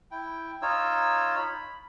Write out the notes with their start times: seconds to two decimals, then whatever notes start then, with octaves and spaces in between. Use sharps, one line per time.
0.11 E4 G5
0.62 D#4 F4 C#5 E6
1.39 B5